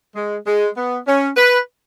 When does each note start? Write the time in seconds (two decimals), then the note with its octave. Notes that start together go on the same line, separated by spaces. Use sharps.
0.16 G#3
0.46 G#3
0.77 B3
1.07 C#4
1.37 B4